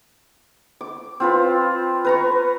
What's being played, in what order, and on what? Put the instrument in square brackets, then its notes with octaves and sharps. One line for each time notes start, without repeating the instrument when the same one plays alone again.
[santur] D6
C4 F4 B4
B4 A#5 C#6